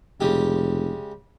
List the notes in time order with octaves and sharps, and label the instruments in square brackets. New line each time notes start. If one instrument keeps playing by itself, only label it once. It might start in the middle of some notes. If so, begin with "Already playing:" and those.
[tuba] F1 [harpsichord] C#3 G#3 G4